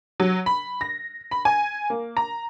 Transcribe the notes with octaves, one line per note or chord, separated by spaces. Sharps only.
F#3
B5
A#6
B5
G#5
A#3
A#5